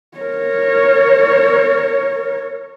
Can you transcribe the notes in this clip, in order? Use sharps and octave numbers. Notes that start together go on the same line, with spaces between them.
A#4 C#5